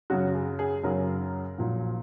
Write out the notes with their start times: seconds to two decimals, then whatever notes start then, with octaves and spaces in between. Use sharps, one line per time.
0.10 F#2 C#3 F#3 F#4
0.35 G#4
0.59 G#4
0.83 F#2 C#3 F#3 A#4
1.58 A#1 A#2 F#3